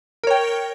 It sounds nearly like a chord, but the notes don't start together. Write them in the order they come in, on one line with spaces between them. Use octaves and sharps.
A#4 C#5 G5